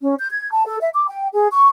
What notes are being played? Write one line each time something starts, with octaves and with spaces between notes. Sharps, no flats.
C#4
G6
G#6
A5
A4
E5
D6
G5
G#4
C#6